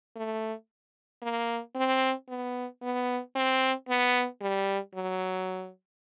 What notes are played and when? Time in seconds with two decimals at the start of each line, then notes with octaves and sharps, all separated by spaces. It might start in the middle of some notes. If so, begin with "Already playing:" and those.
0.16 A3
1.22 A#3
1.75 C4
2.29 B3
2.82 B3
3.36 C4
3.89 B3
4.42 G3
4.95 F#3